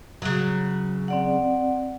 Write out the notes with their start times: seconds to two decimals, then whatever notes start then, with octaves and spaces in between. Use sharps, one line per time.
0.22 C#3 F#3
1.08 C4 D5 F#5